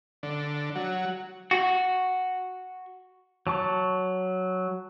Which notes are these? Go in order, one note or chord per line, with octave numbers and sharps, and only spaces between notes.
D3
F#3
F#4
F#3 A5 C#6